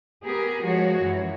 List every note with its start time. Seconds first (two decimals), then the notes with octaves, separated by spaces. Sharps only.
0.24 B3 G4 G#4 A#4
0.63 F3 G#3 F#4 C#5
1.00 F#2 E3